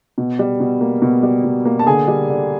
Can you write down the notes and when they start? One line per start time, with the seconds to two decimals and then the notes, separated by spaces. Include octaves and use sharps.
0.18 B2
0.39 G3
0.60 B2
0.81 A#3
1.02 B2
1.23 G3
1.44 B2
1.65 A#3
1.79 A5
1.86 D3 G#4 G#5
2.08 G3
2.29 D3